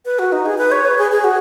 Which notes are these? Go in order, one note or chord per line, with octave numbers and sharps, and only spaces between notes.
B4
F#4
D#4
G#4
B4
C#5
B4
G#4
G#4
F#4